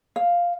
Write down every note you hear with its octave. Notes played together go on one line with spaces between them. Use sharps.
F5